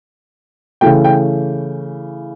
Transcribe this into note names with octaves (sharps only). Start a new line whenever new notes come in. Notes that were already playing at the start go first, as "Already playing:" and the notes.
C#3 E3 A3 G5
G5